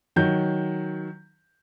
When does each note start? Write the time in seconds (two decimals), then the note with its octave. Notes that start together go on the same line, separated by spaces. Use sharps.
0.16 D#3 F#3 G6